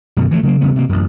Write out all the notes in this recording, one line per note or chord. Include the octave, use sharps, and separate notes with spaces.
F#2 B2 D3
E3 F3 G3 A3
C#3 F#3 G#3 A#3
E1 C#3 G3 B3
C3 A#3
A1 F#2